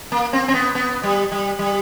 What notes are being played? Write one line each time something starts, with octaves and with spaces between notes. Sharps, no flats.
A#3
C4
C4
B3
B3
G3
G3
G3